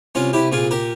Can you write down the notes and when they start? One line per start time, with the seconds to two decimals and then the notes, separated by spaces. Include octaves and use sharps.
0.15 C2 C#4 F4
0.33 C2 E4 G4
0.52 A#2 F4 G#4
0.71 G4 A#4